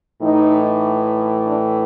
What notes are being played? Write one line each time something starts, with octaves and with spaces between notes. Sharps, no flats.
A2 E3 D#4
D4